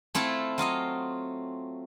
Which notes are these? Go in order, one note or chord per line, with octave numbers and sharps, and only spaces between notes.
A3 C4 E4 F4 A4
F#3 F4 D#5 F5